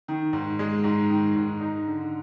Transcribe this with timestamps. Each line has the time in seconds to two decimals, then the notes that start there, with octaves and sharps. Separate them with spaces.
0.08 D#3
0.33 G#2
0.59 G#3
0.84 G#2
1.10 D#3
1.36 G#2
1.61 D#4
1.87 D3